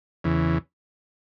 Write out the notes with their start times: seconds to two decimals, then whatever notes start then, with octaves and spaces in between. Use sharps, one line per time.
0.24 E2 C#3 E3